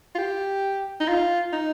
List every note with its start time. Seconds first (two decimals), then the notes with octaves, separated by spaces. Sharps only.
0.15 F4
0.18 G4
1.00 D#4
1.09 F4
1.52 D#4